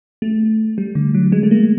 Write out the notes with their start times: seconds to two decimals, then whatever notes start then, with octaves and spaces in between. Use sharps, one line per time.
0.22 A3
0.78 G3
0.95 D3
1.14 F#3
1.32 G#3
1.43 A3
1.51 A#3